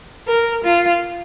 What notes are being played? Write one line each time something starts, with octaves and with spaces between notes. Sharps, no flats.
A#4
F4